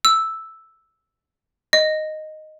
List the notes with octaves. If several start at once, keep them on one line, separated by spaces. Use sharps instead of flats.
E6
D#5